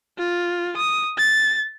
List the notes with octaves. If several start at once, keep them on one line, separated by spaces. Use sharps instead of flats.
F4
D#6
A6